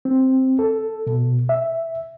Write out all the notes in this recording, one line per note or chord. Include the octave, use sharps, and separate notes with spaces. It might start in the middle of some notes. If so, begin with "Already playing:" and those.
C4
A4
B2
E5